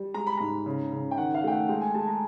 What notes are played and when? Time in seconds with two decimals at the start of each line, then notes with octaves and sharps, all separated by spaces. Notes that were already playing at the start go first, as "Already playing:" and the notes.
Already playing: G3
0.14 G#3 A#5
0.27 B5
0.37 G#2 A#5
0.66 C#3
0.92 C#3
1.11 G5
1.18 D#3 F#5
1.34 F5
1.44 A3 G5
1.52 F#5
1.69 G#3 G5
1.81 G#5
1.94 G#3 A5
2.08 A#5